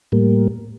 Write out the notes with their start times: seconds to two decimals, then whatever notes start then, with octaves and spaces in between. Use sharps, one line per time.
0.12 A2 G3 A#3